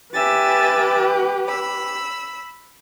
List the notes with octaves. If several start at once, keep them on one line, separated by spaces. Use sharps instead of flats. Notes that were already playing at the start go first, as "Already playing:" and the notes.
G4 B4 E5 G#5 A6
B5 E6